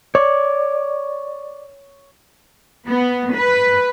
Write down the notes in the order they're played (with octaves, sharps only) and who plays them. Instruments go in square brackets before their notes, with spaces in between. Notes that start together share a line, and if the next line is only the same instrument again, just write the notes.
[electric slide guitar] C#5 [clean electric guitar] D5
[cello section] B3
B4